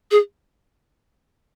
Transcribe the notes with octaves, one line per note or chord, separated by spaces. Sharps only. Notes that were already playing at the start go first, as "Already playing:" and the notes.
G#4